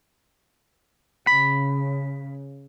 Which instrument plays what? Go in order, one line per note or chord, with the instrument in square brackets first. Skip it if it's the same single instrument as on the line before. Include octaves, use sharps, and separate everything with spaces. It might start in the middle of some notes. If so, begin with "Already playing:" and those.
[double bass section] C#3 [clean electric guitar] B5